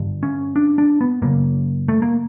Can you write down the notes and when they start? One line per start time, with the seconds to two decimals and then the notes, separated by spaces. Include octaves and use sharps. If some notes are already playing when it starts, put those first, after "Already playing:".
Already playing: G2 D3
0.23 C#4
0.56 D4
0.78 D4
1.01 B3
1.22 F#2 C#3 A#3
1.88 A3
2.02 A#3